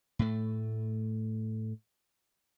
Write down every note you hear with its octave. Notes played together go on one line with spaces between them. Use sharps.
A2 A3